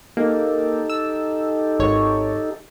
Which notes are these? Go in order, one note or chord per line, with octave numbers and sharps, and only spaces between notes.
A#3 D#4 G4 A4
E6
G#1 C#5